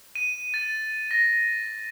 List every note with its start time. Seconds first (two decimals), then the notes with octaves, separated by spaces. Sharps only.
0.15 D#7
0.54 A6
1.11 A#6